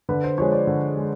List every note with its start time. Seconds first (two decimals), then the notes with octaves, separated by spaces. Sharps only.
0.09 D3 B4
0.23 C5
0.38 F3 G#3 C#5
0.52 D5
0.67 D3
0.96 G#3